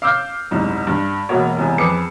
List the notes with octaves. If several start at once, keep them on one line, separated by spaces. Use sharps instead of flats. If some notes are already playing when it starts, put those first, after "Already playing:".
F5 D6 E6 F6 G6
F#1 C2 G#2
G2
E1 B2 A#3 F#4 C#5
E1 C2 G#5
F2 G#4 B4 D6 C#7